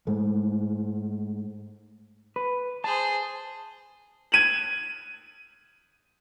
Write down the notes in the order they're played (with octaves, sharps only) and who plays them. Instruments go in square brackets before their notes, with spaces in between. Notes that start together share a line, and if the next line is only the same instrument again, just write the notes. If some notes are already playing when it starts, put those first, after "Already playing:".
[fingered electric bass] G#2 G#3 A3
[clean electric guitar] B4
[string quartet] G#4 C5 [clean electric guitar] A5
[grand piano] G#6 D#7 E7 F#7